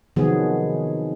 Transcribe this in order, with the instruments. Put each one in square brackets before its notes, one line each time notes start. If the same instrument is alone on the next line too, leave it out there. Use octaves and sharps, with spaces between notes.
[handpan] C3 D#3 F3 F#3 B3 G#4